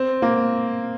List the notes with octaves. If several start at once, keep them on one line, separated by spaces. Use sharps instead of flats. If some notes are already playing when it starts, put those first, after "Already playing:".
Already playing: C4
A#3